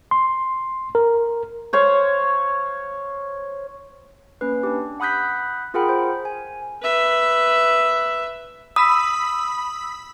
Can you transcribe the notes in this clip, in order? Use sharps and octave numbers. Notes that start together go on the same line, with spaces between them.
C6
A#4
C5 C#5 F5
A#3 C#4 B4
D4 G4
F#5 B5 D#6 F#6 G6 B6
F4 G#4 A#4 F#5 G5 B5
C5
G#5
B4 E5
B5 D#6 E6 B6